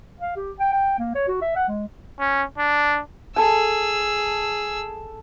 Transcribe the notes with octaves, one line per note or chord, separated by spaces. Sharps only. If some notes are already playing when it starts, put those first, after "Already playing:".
F5
G4
G5
G5
A#3
C#5
F#4
E5
F#5
G#3
C#4
D4
G#4 A4 G#5 E6